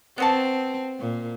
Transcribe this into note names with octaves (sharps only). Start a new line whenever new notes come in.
B3 C4 F#4 A5
A#2